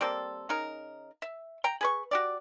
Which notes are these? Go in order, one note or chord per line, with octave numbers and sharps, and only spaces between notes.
G3 A#3 C4 A4
C#3 D#4 A#4
E5
G5 A#5
G#4 B4 C#6
F#4 G4 D5